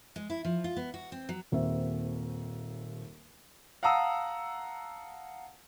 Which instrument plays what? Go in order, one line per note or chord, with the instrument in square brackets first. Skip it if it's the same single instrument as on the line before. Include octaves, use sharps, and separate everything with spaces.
[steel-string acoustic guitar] G#3
E4
F3
F4
B3
F#4
C4
F#3
[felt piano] D#1 D#2 C4 C5 E5
[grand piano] F5 F#5 A5 A#5 D#6 E6